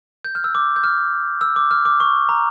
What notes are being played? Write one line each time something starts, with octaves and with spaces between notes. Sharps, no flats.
G6
F6
E6
D6
G6
F6
E6
D6
F6
D6
C#6
A#5